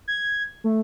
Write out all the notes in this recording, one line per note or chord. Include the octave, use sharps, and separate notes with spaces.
G#6
A3